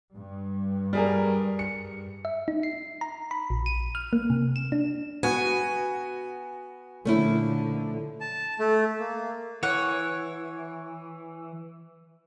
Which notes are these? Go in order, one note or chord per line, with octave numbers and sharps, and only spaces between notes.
G2
G3 G#4 A#4
C#7
E5
D#4
C7
A#5
B5
A#1
D#7
F6
A#3
C3
E7
D4
B3 F#4 G#5
A#2 D3 F3 A3 C#4 E4
A5
A3
A#3
E3 C#5 F#5